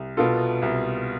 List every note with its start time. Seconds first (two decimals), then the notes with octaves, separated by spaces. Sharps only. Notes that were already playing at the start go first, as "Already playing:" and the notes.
Already playing: C2
0.17 B2 B3 F4 A4
0.62 C2